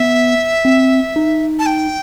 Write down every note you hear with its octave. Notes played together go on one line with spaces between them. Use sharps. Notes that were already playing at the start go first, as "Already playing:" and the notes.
Already playing: B3 E5
C4
D#4
A5
G5